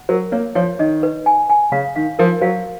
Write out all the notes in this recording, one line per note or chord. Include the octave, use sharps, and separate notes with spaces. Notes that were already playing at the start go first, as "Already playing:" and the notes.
Already playing: F#5
F#3 A#4
A#3 C#5
F3 C#5
D#3 D#5
B4
G#5
G#5
C#3 F5
D#3 F5
F3 A#4
F#3 F5